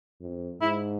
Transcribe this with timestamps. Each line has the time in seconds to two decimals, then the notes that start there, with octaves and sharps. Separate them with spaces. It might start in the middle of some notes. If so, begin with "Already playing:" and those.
0.21 F2
0.61 G#2 E4